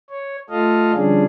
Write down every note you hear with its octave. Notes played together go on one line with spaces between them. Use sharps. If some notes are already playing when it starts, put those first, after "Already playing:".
C#5
A3 F4 A4 D#5 F5
D3 F3 G3 C#4 D4 G#4